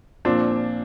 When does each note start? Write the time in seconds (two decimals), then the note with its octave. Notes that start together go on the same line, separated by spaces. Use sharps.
0.25 A#2 F3 C4 D4